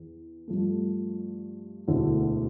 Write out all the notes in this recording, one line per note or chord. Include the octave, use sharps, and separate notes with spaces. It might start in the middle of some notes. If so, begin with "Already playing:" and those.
Already playing: E2
G2 F3 A3
E1 D2 D3 A3 E4